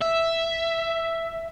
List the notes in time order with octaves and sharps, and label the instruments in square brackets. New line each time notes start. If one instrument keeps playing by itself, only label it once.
[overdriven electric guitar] E5